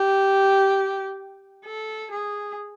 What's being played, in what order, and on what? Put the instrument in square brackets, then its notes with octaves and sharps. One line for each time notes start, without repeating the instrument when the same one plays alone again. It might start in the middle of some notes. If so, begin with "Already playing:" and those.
Already playing: [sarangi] G4
A4
G#4